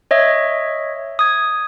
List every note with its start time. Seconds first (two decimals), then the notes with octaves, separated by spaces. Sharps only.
0.11 C#5 D#5 E5
1.19 D#6 G#6